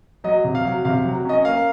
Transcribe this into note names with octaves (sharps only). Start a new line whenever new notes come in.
F#3 D#5
C3
F5
F#3
C3 F5
F#3
C#4 D#5
A#3 F5